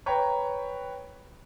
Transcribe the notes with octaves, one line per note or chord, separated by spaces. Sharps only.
B4 C#5 G5 A#5